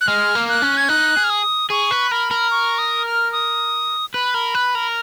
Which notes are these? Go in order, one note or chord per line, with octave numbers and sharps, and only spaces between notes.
F#6
G#3 F6
A#3
F#6
C#4
G#6
D#4 F#6
G#4
F6
D#6
G#4 C#6
B4
A#4 B5
A#4
C#6
D#6
F6
D#6
B4 B5
A#4
B4
A#4